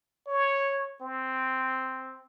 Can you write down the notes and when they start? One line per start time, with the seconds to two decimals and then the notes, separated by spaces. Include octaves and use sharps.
0.28 C#5
1.02 C4